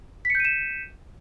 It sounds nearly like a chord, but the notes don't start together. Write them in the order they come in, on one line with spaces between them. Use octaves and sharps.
B6 C#7 G6 D#7 E7